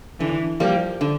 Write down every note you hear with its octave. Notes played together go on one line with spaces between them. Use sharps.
D3 E3
F3 G3 A#3
D3